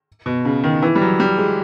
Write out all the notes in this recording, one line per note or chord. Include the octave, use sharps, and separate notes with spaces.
B2
C#3
D#3
E3
G3
F#3
G3
G#3